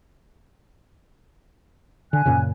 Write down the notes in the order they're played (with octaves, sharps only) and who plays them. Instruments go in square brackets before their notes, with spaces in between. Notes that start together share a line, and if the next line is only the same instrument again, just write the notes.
[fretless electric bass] D3 [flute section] G#5 F#6
[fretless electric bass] F#2 A#2 C#3